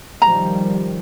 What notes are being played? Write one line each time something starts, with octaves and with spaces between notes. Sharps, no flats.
D#3 F3 G3 A#5